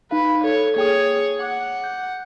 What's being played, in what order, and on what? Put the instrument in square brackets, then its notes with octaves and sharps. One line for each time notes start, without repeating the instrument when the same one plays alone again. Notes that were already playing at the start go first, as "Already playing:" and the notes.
[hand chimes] D#4 F5 [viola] B4
[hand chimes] A4 [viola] C#5
[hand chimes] A#3 G5 D#6 [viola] G#4 C#5
[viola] F#5 [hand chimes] D6
[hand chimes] G6